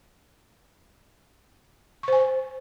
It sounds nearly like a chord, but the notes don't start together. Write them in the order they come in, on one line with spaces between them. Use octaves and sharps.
C#6 C5 G#5